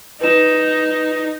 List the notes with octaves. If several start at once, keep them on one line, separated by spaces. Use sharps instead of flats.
D#4 B4 E7